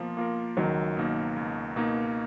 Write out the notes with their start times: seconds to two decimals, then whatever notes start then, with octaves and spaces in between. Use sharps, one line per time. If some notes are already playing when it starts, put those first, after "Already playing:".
Already playing: B2 F3 A#3 F4
0.17 A#3 F4 A#4
0.57 C#2 D#3 F#3
0.97 B2 A#3 D#4
1.36 C#2
1.76 B2 A#3 D#4